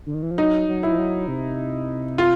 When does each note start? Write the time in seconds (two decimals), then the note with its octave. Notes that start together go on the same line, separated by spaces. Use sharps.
0.06 D3
0.14 D#3
0.22 E3
0.31 F3
0.38 F#3 D#4
0.68 F#3
0.83 E4
0.92 F3
0.98 F#3
1.28 C3
2.18 F4